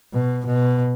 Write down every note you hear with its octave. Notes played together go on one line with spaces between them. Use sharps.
B2
B2